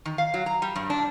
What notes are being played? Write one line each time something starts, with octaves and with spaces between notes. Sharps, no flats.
D#3
F5
F#3
A#5
G3
G2
D4